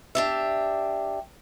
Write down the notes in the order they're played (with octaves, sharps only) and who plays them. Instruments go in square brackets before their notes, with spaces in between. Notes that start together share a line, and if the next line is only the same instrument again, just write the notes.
[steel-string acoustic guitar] D4 G4 E5